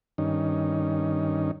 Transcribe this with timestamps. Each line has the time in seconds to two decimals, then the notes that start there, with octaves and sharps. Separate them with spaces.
0.18 G2 D#3 C#4 D#4